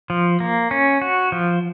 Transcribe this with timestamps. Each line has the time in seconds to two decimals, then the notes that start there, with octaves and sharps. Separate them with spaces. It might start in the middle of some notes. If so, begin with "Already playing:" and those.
0.10 F3
0.40 A#3
0.71 C#4
1.02 F#4
1.32 F3